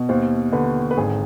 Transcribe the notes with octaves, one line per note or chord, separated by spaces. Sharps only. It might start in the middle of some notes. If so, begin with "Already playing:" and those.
Already playing: B2
D#2 C5
D3 B4
B4
G#1 G#4